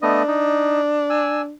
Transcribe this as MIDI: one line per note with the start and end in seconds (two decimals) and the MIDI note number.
0.02 0.23 57
0.02 0.23 59
0.02 1.53 62
0.02 0.23 75
0.28 0.81 63
1.10 1.42 80
1.10 1.42 88